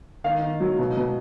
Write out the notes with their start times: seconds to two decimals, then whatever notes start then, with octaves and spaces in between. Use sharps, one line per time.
0.24 D#3 F5
0.42 D#3
0.60 F#3
0.79 B2
0.97 B2